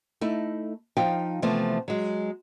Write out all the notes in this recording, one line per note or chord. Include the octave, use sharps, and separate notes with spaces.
A3 D#4 E4
F3 D#4 F5 G5
C3 E3 F3 A3 B3
F#3 G#3